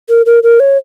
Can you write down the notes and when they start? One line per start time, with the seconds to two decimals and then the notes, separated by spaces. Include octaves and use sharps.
0.09 A#4
0.26 A#4
0.43 A#4
0.60 C#5